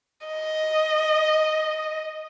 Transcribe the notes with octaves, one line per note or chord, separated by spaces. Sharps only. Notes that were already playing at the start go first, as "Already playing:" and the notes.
D#5